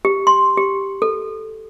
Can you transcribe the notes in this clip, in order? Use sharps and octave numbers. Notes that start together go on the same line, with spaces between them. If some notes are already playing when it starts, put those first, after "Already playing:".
G4
C6
G4
A4